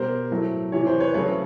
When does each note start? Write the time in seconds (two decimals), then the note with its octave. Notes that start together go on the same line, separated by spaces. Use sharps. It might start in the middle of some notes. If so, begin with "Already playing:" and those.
Already playing: B2 G3 A#4 C5
0.31 A2 F#3 A3
0.72 C3 E3 G3 C#5
0.87 C5
1.00 B4 C#5
1.14 C#3 F#3 A3 B4 C#5